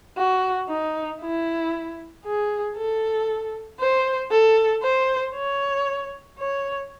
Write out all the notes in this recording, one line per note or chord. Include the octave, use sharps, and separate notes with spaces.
F#4
D#4
E4
G#4
A4
C5
A4
C5
C#5
C#5